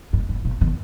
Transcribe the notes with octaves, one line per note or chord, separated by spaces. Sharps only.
G#2
G#2
A#2
D#3